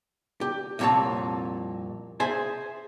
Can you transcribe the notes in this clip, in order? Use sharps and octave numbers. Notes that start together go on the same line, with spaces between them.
G4
C2 F2 A#2 C4 C#5 A5
G#4 C5 E5 G#5